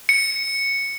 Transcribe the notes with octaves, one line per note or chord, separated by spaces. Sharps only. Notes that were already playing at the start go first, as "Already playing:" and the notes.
C#7